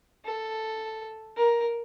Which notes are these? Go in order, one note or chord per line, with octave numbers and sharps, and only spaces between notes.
A4
A#4